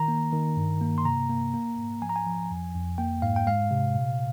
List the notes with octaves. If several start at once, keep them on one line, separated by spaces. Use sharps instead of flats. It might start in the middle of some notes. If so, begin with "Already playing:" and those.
Already playing: D#3 A#5
A#3
D#3
G2
A#3
C6
C3 A#5
A#3
A#3
G#2
F3 G#5
A#5
G#5
F3
F2
F2
A#3 G5
G#2 F5
G5
G#3 F5
C3
A#2